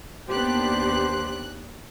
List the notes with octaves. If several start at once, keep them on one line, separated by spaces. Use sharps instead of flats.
D#2 B3 D4 G4 C5 F#6